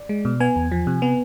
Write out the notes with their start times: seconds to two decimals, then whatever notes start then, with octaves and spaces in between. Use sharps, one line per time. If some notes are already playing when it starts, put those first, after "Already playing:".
Already playing: D5
0.09 G#3
0.25 B2
0.40 B3 G#5
0.56 E2
0.72 F3
0.87 C3
1.02 B3